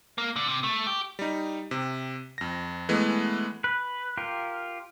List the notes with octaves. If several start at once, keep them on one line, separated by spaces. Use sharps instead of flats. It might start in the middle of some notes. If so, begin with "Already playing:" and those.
A#3
D3
C3
A3
G4
G3 D#4
C3
F2 A#6
E3 G#3 A3 B3
B4
F4 G4 A#4